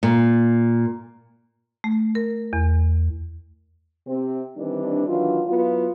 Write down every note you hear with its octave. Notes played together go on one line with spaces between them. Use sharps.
A#2
A3
A#4
E2
C3 C4
D#3 E3 G3 C4 D4
D#3 E3 F#3 D4 F4
F#3 B3 E4 F4